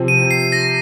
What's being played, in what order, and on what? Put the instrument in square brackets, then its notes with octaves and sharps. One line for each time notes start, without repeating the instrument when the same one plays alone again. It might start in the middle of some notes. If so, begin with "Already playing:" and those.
Already playing: [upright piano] C3 F3 C4
[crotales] D#7
C7
A#6